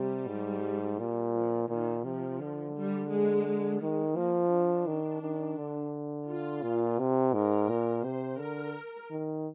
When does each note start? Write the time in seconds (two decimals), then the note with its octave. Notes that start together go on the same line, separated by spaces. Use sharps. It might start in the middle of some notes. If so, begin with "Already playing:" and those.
Already playing: C3 G3
0.28 G#2
0.99 A#2
1.34 F3
1.69 A#2 D#3
2.04 C3 F3
2.40 D3
2.75 G3
3.10 G#3
3.81 D#3 G#3
4.16 F3 A#3
4.51 D4
4.87 D#3
5.22 D#3
5.58 D3
6.28 F4
6.63 A#2
6.99 C3
7.34 G#2 A#4
7.69 A#2
8.04 C3 C5
8.40 D3 A#4
9.11 D#3